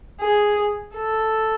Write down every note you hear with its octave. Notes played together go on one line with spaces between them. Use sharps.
G#4
A4